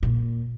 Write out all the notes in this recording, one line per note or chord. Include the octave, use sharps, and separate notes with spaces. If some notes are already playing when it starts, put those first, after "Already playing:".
A#2